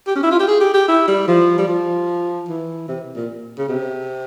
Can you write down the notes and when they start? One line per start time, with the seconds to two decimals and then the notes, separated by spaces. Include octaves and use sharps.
0.07 G4
0.15 C#4
0.23 E4
0.31 F4
0.39 G4
0.47 G#4
0.60 G4
0.74 G4
0.88 E4
1.08 G3
1.27 F3
1.58 G3
1.68 F3
2.49 E3
2.88 C3
3.15 A#2
3.59 C#3
3.68 C3